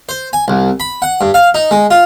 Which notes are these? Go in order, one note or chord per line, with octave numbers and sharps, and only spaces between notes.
C5
G#5
C2
B5
F#5
G2
F5
D#4
G#3
F4